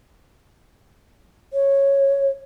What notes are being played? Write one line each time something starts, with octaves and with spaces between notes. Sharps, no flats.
C#5